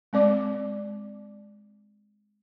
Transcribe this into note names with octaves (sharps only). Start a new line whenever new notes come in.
G#3 C4 D5 D6